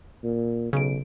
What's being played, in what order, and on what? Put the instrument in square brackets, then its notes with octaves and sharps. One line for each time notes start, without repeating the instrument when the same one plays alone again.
[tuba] A#2
[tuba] B1 [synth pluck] C#3 D7